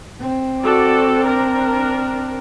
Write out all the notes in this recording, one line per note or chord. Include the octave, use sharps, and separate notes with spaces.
C4
F#4 A4 D5
D4 A#4